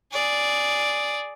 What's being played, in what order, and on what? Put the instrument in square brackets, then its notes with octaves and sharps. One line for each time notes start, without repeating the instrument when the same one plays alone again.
[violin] G#4 D5